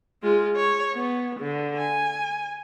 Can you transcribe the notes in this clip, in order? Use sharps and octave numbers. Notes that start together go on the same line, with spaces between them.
G#3 F4
C#5
B3
D3
G#5